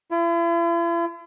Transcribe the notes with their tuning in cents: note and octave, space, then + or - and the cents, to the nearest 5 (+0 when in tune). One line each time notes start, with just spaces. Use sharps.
E4 +45